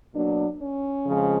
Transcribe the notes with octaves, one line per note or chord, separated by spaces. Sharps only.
B2 F#3 A#3 D4
C#4
F2 C#3 F3 G#3